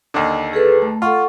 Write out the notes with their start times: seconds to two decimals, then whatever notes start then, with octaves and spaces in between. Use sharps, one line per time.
0.14 D#2 D3
0.53 G#4 A4 B4
0.82 A3
1.02 F4 A4 F#5 C#6